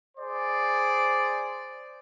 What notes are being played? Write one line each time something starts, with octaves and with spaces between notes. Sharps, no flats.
G#4 C5 D5